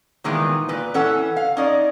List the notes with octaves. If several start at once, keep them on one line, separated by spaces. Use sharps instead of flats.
A#2 D#3 E3 G#3 B3
A#2 B4
E3 C#4 A4 F#5
F5
C#4 D#4 D5